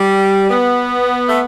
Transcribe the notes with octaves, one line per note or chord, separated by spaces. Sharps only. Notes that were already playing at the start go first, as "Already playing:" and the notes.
Already playing: G3
B3
A3